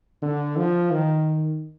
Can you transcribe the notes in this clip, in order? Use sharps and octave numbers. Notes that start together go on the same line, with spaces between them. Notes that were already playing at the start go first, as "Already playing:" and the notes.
D3
F3
D#3